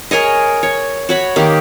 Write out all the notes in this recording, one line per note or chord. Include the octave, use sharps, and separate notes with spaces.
G#4 A#4 C#5 D#5
C#5
F#4 C#5 B5
D#3 A#3 G4